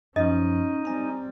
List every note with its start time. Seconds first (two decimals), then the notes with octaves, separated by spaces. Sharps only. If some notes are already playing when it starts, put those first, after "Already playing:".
0.16 F#2 F3 C#4 D#4 D#5
0.85 G3 C4 G#5 A#5